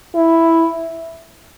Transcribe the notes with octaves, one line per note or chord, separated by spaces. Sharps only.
E4